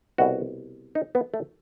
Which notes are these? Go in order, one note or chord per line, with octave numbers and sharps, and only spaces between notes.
C2 B2 F#4
D#4
B3
A3